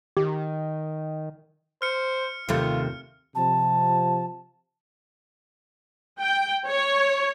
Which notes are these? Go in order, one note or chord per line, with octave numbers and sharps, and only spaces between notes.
D#3 G4
C5 F6 C#7
D#2 C3 A3 F4
C3 F3 A5
G5
C#5